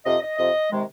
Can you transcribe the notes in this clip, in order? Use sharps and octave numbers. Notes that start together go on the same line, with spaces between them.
F2 C3 F3 D#5
D#5
F2 C3 F3 D#5
C3 D#3 G#3